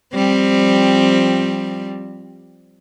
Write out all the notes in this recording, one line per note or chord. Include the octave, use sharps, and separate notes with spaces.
F3 G3 C4